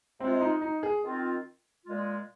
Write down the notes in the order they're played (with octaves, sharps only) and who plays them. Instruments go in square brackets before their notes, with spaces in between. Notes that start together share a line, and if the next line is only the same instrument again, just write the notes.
[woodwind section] C3 G#3 F4 [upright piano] C4
[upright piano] D#4
D#4
G#4
[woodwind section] D#3 C4 F4
A#2 G#3 F4